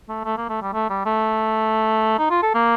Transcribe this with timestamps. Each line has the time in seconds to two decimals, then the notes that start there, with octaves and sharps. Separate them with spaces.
0.09 A3
0.25 A3
0.37 A#3
0.49 A3
0.62 G3
0.73 A3
0.90 G3
1.05 A3
2.18 D#4
2.30 F4
2.42 A4
2.54 A#3